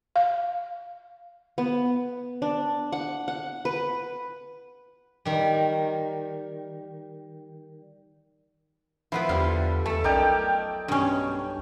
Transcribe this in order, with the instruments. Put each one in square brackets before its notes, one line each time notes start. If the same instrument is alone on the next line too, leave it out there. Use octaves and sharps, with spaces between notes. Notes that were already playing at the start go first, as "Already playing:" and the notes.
[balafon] F5
[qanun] B3
D4
F#5
F#5
B4
[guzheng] D#3 G3
[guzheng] F3 B3 B4 [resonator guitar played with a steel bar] E4
[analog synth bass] E2 [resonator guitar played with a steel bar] D3 G3 [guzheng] F4
[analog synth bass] E2 [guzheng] A3 [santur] A4 A5
[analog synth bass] B1 [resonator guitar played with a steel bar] C#4 A#4 [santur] D#4 D5 G5
[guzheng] G2 C#4 [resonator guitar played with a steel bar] B2